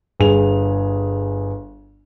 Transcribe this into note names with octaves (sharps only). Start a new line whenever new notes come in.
G1 G#4 F7